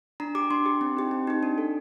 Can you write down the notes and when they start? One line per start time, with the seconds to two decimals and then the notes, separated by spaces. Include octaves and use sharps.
0.20 D4 A#5
0.35 G4 D6
0.51 D4 C6
0.66 G4
0.81 C4
0.97 D#4 G4
1.11 C4
1.27 D#4 G4
1.43 D4
1.58 A4